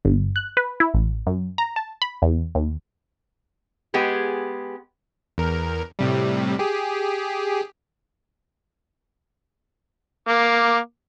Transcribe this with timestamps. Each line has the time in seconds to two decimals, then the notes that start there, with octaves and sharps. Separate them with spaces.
0.05 G1
0.36 F#6
0.57 B4
0.80 E4
0.94 A1
1.27 F#2
1.58 A#5
1.76 A5
2.02 B5
2.22 E2
2.55 D#2
3.94 G#3 B3 G4 G#4
5.38 E2 A#4
5.99 A2 C3 G3
6.59 G4 G#4
10.28 A#3 D6